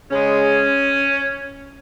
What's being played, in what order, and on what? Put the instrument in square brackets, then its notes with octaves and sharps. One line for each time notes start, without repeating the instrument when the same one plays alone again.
[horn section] C#3 G#3 C#4